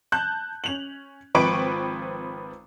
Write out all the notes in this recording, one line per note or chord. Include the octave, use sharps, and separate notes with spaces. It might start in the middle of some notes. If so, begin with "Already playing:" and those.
A5 F#6 G6
C#4 F7 F#7
G#1 F3 C4 B4 C#6 D7